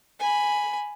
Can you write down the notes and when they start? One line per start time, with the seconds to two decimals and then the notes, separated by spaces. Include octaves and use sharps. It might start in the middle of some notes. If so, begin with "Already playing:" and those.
0.19 G#5 B5